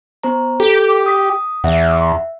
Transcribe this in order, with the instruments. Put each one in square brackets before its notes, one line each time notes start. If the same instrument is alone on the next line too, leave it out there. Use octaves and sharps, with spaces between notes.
[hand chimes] B3 C5 A#5
[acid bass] G4 [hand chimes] A4
[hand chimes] D#6 B6
[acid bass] E2 [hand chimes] E5 F#5